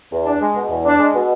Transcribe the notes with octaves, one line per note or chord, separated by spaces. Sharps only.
E2
D4
G#3
B2
E2
D4
G#3
B2